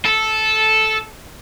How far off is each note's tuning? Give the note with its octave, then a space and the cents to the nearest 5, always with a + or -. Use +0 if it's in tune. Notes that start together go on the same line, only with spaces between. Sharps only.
A4 -10